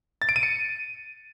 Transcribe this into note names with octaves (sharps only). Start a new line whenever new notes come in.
A6
D7
D#7
C#7